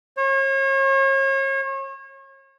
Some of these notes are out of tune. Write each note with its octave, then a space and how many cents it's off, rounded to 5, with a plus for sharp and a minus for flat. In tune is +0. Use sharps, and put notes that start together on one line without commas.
C#5 -35